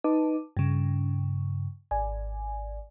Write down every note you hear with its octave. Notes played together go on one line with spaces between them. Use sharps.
D#4 B4 D#5 A5 D6
G2 C#3
G#1 D5 G#5